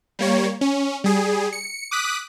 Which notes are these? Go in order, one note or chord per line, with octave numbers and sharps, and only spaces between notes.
G3 A#3 C#5
C#4
G3 G#4
C#7
D6 D#6 F#6 B6